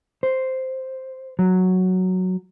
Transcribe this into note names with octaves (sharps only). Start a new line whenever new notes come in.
C5
F#3